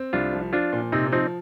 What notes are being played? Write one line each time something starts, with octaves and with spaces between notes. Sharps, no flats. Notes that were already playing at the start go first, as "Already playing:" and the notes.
Already playing: C4
C2 D4 F4
F3
F3 D4 F4
A#2
C3 C4 D#4
F3 C4 D#4